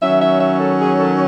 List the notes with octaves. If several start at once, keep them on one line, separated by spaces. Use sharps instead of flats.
D#3 F#3 C#4 E5
E5
E5
A4
G#4
A4